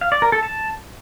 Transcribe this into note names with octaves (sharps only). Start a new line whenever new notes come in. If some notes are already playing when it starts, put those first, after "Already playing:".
F5
D5
A#4
A4
A5